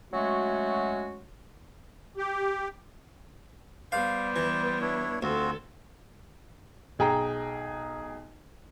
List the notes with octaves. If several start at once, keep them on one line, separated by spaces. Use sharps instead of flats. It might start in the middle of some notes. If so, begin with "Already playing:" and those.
F#3 G#3 A3 C#4 F#4
G4
G3 B3 C5 D5 F5
E3
D4 E4 C#5
D2 C4 F4 F#4 A4
B1 G#4 G5 A#5